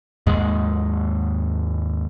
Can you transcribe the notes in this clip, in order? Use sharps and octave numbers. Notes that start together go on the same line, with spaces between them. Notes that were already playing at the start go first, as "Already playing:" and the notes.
D#2 G#2 G#3